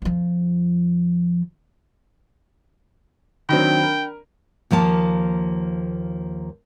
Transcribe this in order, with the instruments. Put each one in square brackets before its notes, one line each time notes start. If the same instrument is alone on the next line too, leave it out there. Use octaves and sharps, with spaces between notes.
[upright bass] F2 F3
[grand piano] D#3 F#3 C4 [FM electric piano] D4 B5 [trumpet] G5
[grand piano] A#4
[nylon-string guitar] D#2 F3 A#3 A5